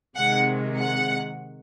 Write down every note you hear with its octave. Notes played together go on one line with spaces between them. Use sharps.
C3 D#3 G#3 F#5
F#5